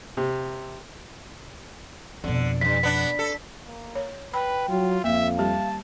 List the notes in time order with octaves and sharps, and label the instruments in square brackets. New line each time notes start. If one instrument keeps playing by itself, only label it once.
[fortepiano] C3
[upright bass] F2 B2 [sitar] D3
[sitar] E2 G2 [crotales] B6
[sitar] B3 D4
A4
[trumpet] A#3
[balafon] C#5
[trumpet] B4 [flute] G5 [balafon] B5
[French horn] F#3 [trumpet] F4
[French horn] F2 [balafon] A#3 [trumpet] E5 [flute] F5
[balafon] G3 G4 [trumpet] A5